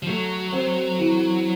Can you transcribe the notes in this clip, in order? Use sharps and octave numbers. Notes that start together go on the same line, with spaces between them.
F3
F#3 A3
C4
E3